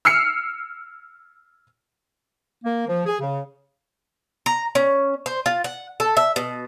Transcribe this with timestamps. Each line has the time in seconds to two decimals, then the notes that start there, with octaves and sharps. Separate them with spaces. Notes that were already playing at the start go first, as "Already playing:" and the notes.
0.05 E6 F6 C7 C#7
2.64 A#3
2.88 F3
3.06 G#4
3.20 C#3
4.46 A#5
4.75 C#4
5.26 C5
5.46 F4
5.64 F#5
6.00 A4
6.17 E5
6.36 B2